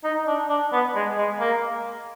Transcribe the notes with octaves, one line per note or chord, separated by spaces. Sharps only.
D#4
D4
D4
B3
G#3
G#3
A#3